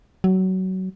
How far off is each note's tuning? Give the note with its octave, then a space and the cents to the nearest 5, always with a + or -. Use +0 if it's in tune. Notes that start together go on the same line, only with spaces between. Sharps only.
F#3 +20